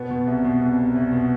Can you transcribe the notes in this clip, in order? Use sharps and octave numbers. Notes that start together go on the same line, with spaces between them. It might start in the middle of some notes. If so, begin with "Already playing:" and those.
Already playing: B2 B3
B2
C2
B2
C2
C2
C2
B2